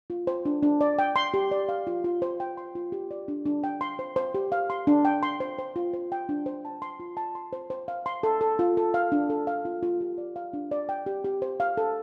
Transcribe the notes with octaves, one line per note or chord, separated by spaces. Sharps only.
F4
C5
D4
D4
D5
G5
C6
G4
D5
F5
F4
F4
C5
G5
C6
F4
G4
D5
D4
D4
G5
C6
C5
C5
G4
F5
C6
D4
G5
C6
C5
C5
F4
C5
G5
D4
C5
A5
C6
F4
A5
C6
C5
C5
F5
C6
A4
A4
F4
A4
F5
D4
A4
F5
F4
F4
G4
D5
F5
D4
D5
G5
G4
G4
C5
F5
A4